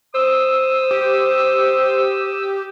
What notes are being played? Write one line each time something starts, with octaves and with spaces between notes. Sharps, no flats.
C5 D#6 E6
G4